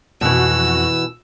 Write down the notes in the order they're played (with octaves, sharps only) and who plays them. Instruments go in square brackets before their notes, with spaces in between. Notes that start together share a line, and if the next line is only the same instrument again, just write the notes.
[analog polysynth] F2 F#4 F#6 [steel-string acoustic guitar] B2 E3 [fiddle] E6